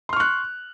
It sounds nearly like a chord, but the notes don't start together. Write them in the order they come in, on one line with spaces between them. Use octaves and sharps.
C6 F6 C#6 F#6